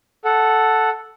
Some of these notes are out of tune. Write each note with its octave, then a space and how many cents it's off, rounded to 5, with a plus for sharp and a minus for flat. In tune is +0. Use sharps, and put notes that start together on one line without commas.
A4 +0 F#5 +0